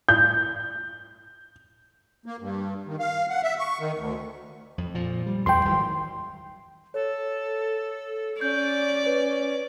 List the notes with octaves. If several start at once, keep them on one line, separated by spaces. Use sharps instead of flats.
G6
A#3
G2
D#3
F5
F#5
E5
C#6
D#3
D2
F2
A#2 F3
G3
E2 G3 G5 C6
G#1 F#3
A4 C#5
C#4 D5 G6
B4 C#5